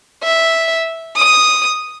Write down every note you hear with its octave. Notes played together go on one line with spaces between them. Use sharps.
E5
D#6